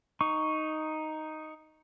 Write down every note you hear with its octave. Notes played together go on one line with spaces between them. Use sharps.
D#4 C#6